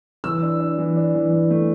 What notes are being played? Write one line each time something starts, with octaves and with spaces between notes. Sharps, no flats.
E3 E6
D4
D4
E3
D4
E3
E3
A3